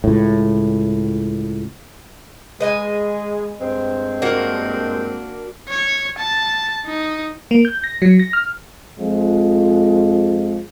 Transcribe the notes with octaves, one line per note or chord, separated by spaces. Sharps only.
C#2 A2
G#3 G#4 B4 D#5 G#5
G2 G#3 C4
A#3 D4 F#4
C#5
A5
D#4
A#3
G6
A#6
F#3
A#6
F6
F2 F3 G#3